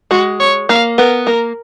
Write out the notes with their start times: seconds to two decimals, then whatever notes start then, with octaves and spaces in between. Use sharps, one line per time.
0.11 G#3 F#4
0.40 C#5
0.69 A#3 F5
0.98 B3 A#4
1.26 A#3 A#4